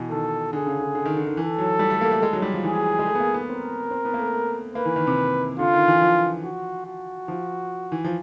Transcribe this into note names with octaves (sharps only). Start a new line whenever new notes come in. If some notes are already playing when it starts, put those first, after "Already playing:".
Already playing: B2 E3
D#3 A4
D3 G#4
C#3
D3
D3
D#3
D3
D#3
E3 A4
F#3
G3
A3
A#3
A3
G#3
F#3
G3
F3
E3 G#4
G#3
A3
B3
A#3
B3
C4 A#4
C4
B3
A#3
A3
A3
A#3 B4
E3
D#3
C3
D3 F4
D#3
E3
F3
F#4
F#4
F3
E3
F3